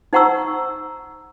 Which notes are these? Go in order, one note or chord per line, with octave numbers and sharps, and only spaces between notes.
D#4 C5 F#5 A#5 C#6 E6